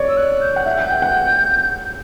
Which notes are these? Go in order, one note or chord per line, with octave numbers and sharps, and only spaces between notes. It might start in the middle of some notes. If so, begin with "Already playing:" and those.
Already playing: C#5 D5
E6
F#6
G6
F#5
E5 G6
F#5 G6
G5
F#5